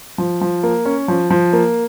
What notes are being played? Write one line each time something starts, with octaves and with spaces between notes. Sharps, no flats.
F3
F3
A#3
C#4
F3
F3
A#3